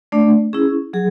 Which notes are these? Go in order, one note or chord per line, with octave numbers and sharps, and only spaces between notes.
A3 D4 D5
C#4 E4 G#4
F#3 G#4